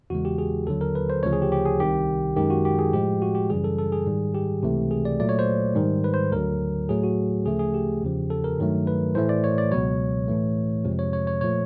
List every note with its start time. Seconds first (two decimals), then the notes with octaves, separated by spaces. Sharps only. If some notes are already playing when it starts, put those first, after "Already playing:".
0.10 E2 C#3 E3 G#3 F#4
0.25 G4
0.38 G#4
0.67 D#2 D3 F#3 A4
0.81 A#4
0.95 B4
1.10 C5
1.23 D2 C#3 F3 C#5
1.33 G#4
1.42 G4
1.52 G4
1.66 G#4
1.80 C2 C3 D#3 G4
2.36 F#2 D#3 G#3 G4
2.50 F#4
2.65 G4
2.79 G#4
2.93 A2 F3 G#3 G4
3.22 F#4
3.35 G4
3.50 F#2 C#3 E3 G3 G#4
3.64 A4
3.78 A4
3.92 G#4
4.07 G#2 D#3 G3
4.35 G4
4.63 C#2 C3 E3 A3
4.91 G#4
5.05 D5
5.20 A#2 F#3 A3 D5
5.29 C#5
5.39 C5
5.76 G#2 D#3 G3
6.04 B4
6.14 C5
6.32 D2 D3 F#3 A#4
6.89 A2 F#3 A3 G#4
7.04 F#4
7.45 D2 C#3 F3 A3 G#4
7.59 G#4
7.74 G4
8.02 E2 C#3 F3
8.30 A4
8.44 A#4
8.59 G2 D#3 F#3 A3
8.87 B4
9.15 A2 E3 A3 C5
9.29 D5
9.44 C#5
9.58 D5
9.72 C#2 B2 F#3 C#5
10.28 A2 E3 A3
10.85 F2 C3 F3 G#3
10.99 C#5
11.13 C#5
11.27 C#5
11.41 A#2 F3 A3 C#5